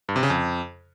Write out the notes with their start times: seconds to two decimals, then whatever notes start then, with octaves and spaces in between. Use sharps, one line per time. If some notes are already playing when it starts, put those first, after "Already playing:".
0.09 G2
0.16 C3
0.23 C#3
0.30 F2